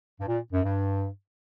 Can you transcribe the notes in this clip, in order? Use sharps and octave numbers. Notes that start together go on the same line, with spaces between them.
G2
A#2
F#2
G2